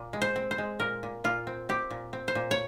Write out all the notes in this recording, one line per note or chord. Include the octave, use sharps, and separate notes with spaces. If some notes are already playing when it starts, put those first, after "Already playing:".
Already playing: A#2
G#3
C5
C4
C5
G#3
A#2 A#4
A#2
A#2 F4
C4
C4 G4
A#2
C4
C5
A#2
C#5